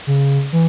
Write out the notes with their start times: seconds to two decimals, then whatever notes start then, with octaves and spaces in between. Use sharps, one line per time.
0.07 C#3
0.53 E3